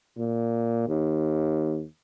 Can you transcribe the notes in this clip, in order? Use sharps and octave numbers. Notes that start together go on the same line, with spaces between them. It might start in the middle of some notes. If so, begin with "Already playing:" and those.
A#2
D#2